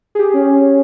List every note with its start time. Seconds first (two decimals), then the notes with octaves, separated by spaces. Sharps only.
0.15 G4 G#4
0.33 C#4